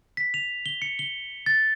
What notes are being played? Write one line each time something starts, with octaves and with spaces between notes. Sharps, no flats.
B6
F7
G7
C#7
G7
A6